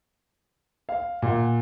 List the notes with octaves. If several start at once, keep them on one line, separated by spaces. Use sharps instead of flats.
F5
A#2 F#5